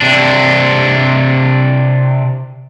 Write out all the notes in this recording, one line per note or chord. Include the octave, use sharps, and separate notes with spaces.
C3 D4